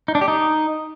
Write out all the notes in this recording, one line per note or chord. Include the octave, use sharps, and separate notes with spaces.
D#4
D4
G4
D#4